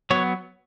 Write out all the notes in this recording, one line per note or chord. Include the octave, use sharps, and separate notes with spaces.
F#3 B3 C#5